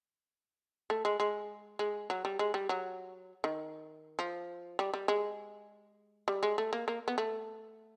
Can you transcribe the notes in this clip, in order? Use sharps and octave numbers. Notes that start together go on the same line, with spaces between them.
A3
G#3
G#3
G#3
F#3
G3
G#3
G3
F#3
D#3
F3
G3
G3
G#3
G3
G#3
A3
A#3
A#3
B3
A3